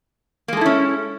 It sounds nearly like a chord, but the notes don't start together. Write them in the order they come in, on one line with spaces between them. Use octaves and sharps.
A#3 G#3 A4 E4 C#4